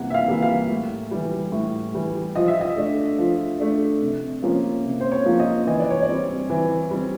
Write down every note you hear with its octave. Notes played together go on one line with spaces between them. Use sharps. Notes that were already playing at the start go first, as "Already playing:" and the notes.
Already playing: C3 E3 G3 A#3 F#5
E5
F5
E3 G3 A#3
F5
A2
E3 G3
A2
E3 G3
F3 D#5
E5
D#5
A3 D4
F3
A3 D4
C3
F3 A#3 C#4
C3
C5
C#5
F3 A#3 C#4
D#5
E3 D#5
D5
C#5
D5
G3 C4
E3
G3 C4